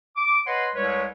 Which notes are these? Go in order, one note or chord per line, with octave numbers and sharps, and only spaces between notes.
D6
B4 C#5 D#5 F#5 C6
C2 G3 G#3 B4 C#5